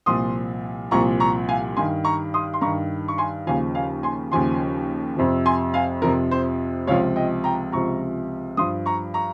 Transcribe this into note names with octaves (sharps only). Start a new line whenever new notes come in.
C2 A#2 F3 C6 D#6
C2 A#2 F3 A#5 C#6
A#5 C#6
F5 G#5
G2 D#3 G#5 C6
A#5 C#6
C6 D#6
C6
G2 D#3 A#5 C#6
C#6
G#5 C6
D#2 C#3 F3 F5 G#5
F5 G#5
G#5 C6
D#2 C#3 F3 G#5 C6
F2 C3 F3
G#5 C6
F5 G#5
F2 C3 F3 A#4
C5
C#2 C3 F3 C#5 F5
D#5 G5
G5 A#5
C#2 C3 F3 A#5 C#6
G2 F3 C6 D#6
A#5 C#6
A#5 C#6